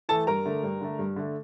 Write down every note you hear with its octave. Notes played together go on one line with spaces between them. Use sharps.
E3 A3 A4 A5
G2 A#4 A#5
D3 A3
G2
D3 A3
G2
D3 A3